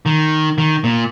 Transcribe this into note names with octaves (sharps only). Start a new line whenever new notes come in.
D#3
D#3
A#2